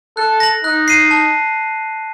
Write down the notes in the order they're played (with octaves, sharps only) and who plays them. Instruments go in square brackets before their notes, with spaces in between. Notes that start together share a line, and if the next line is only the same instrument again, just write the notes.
[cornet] A4 [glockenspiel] F#6
[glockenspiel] A#6 F#7
[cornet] D#4 [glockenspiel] F#6
[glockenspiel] C7 D#7
A5